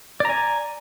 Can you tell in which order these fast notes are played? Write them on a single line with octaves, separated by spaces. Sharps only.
D5 A#5 G#5